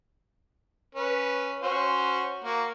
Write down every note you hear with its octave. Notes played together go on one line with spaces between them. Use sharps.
C#4 B4
C#4 F#4 C5
A#3 F#4